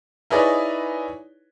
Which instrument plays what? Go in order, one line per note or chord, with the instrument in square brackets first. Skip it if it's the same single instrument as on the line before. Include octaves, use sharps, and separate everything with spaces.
[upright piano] D#4 E4 G#4 B4 C#5 D5